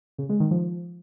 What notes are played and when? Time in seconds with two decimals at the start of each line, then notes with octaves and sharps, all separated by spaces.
0.18 C#3
0.29 G#3
0.40 D#3
0.51 F3